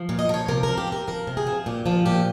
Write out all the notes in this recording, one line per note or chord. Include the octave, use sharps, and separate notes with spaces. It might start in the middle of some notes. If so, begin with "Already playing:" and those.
Already playing: F3
A#2
D#5
F3 C#5
C3 A#4
F3 A#4
G4
C3 A#4
F3 A#4
C3
G#4
F3
A#2 G4
F3 F4
A#2 G4